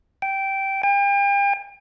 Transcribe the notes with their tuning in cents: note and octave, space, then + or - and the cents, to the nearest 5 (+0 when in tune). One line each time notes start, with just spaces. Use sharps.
G5 -10
G5 +40